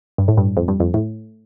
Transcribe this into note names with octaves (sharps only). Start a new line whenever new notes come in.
G2
A2
G2
F2
G2
F2
A2